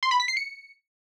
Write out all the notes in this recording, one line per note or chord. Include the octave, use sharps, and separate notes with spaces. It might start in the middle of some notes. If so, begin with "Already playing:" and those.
C6
B5
B6
C7
C#7